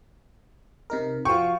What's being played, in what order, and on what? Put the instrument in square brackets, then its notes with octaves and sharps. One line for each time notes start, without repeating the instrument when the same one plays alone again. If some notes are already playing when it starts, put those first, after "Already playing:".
[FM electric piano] C3 D#4 A#4
[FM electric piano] F3 F#4 G5 [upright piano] F4 C#6